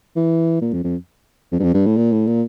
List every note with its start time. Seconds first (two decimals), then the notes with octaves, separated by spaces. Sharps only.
0.16 E3
0.61 A#2
0.73 F2
0.84 F2
1.52 F2
1.59 G2
1.63 F2
1.74 G2
1.86 A2
1.97 A#2
2.12 A2
2.27 A#2